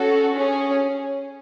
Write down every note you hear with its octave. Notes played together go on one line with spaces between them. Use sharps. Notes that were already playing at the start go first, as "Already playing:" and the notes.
Already playing: C#4 F#4 A4
C#4 G#4